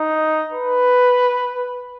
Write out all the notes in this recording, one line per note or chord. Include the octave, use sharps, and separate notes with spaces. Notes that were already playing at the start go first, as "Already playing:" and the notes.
Already playing: D#4
B4